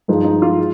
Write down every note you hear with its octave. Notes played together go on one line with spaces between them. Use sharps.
G2 F3 G#3 D#4
D#4
F4
G#3